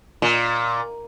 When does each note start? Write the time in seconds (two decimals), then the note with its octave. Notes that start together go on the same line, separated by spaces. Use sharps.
0.22 A#2